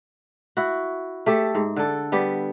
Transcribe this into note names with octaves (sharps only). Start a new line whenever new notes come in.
E4 F#4
A3 G4 A4
G#2
D3 A4
G3 B3 G4